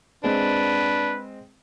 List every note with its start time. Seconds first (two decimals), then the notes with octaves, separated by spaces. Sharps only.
0.24 G#3 C4 D4 B4